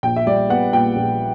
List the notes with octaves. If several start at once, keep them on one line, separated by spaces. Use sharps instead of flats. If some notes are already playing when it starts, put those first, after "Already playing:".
A#1 G5
E5
G3 D5
B3 F#5
A#2 G5
A#1